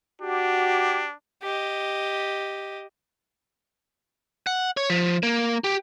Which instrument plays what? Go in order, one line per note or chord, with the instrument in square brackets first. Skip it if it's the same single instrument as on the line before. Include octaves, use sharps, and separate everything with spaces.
[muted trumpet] D4 [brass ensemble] F#4 G4
[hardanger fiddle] G4 D#5
[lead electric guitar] F#5
C#5
F3
A#3
G4